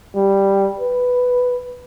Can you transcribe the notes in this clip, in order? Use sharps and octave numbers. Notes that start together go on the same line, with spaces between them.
G3
B4